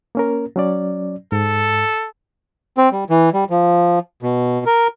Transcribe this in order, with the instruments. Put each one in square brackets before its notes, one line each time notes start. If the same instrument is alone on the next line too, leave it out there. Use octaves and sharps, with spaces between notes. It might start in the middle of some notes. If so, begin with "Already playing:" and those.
[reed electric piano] A#3 C#4 A#4
F#3 C#4 D5
[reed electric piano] G#2 [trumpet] A4
[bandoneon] C4
G3
E3
G3
F3
B2
A#4